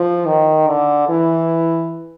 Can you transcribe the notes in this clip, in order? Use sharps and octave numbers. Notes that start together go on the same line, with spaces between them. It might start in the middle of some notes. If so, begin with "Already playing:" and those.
Already playing: F3
D#3
D3
E3